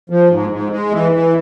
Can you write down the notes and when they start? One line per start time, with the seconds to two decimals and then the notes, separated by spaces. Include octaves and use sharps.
0.10 F3
0.30 G#2
0.50 G#2
0.70 G#3
0.91 E3
1.12 E3